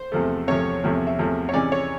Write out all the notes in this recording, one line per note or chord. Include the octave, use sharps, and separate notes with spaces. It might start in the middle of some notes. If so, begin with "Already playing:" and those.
Already playing: C5
E2 C3 F3 A3
E2 C3 F3 A3 C#5
E2 C3 F3 A3
E5
E2 C3 F3 A3
C#5
C3 E3 G#3 C#4 D5
C#5